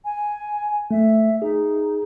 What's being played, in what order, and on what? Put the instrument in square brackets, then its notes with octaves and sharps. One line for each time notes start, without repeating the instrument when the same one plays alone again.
[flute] G#5
[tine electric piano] A3 [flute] E5
[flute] D#4 [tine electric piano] G#4